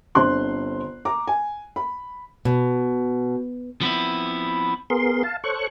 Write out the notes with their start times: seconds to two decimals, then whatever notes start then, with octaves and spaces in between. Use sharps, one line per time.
0.15 G1 D3 C4 C5 C6 F#6
1.05 A#5 D6
1.27 G#5
1.76 B5
2.45 B2
3.81 F3 B3 C4 E4
4.90 B3 G#4 A#4 C6
5.23 F5 A5
5.44 A4 C5 C#5 C#6 F#6